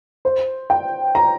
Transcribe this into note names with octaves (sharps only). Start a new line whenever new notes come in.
C5
G5
A#5